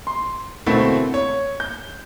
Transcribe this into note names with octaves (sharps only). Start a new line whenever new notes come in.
C6
B2 D3 A3 A#3 C4 E4
C#5
G6